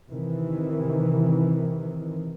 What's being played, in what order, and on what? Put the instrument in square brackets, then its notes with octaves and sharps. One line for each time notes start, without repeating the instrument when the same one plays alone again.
[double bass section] C3 D#3 E3